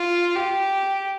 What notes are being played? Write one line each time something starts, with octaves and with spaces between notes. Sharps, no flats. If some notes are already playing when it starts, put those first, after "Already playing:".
Already playing: F4
G4